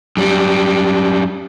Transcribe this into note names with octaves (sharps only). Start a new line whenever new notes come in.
F#2 G3